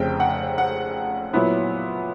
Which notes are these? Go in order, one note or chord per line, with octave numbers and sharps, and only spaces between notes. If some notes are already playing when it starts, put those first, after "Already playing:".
Already playing: F1 F2 C#3 G5
F#5
F#5
A#2 F#3 B3 E4